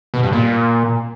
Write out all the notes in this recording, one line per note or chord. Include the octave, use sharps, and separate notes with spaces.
B2
G2
A#2